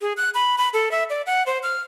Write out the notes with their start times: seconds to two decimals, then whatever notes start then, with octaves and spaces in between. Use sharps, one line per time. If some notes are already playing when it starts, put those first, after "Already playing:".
0.01 G#4
0.17 F#6
0.34 B5
0.58 B5
0.73 A4
0.91 E5
1.10 D5
1.27 F#5
1.46 C5
1.63 F6